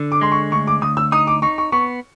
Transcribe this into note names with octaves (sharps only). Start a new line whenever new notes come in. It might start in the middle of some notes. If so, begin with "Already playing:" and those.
Already playing: D3
D6
G#3 C6
C#6
D2 C#6
D6
D2 D#6
E6
D#4 D#6
D6
D#4 C#6
C#6
B3 C#6